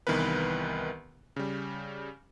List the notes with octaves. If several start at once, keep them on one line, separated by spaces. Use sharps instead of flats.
C2 D#3 E3 B3 A#4 B4
C#3 G3